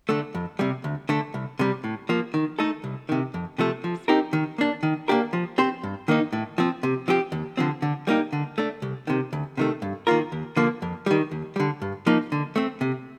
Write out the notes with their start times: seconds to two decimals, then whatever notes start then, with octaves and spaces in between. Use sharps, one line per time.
0.09 D3 A3
0.35 F2
0.59 C3 G3
0.84 D2
1.09 D3 A3
1.34 C2
1.59 C3 G3
1.84 A2
2.09 F3 A#3
2.34 D#3
2.59 A3 D#4 A4
2.84 C2
3.09 C3 D#3
3.34 F2
3.58 C3 F3 A3
3.84 F3
4.08 C4 D#4 G4 A#4
4.33 D#3
4.58 A#3 D4
4.83 D#3
5.08 A#3 D4 G4 A#4
5.33 F3
5.58 C4 G4 C5
5.83 G2
6.08 D#3 A#3 D#4
6.33 A2
6.58 F3 C4
6.83 C3
7.08 F3 C4 G4
7.32 D#2
7.57 D3 F3 C4
7.82 D3
8.07 G3 A#3 D#4 G4
8.33 D3
8.58 A3 D4
8.82 C2
9.07 C3 D#3
9.33 D2
9.57 C3 D#3 A3
9.82 G2
10.07 D#3 A#3 F4 A#4
10.32 D#2
10.56 D3 F3 A#3
10.82 F2
11.06 D#3 G3
11.31 D#2
11.56 D3 G3
11.82 G2
12.06 F3 A#3 D#4
12.32 D3
12.56 A3 C4
12.81 C3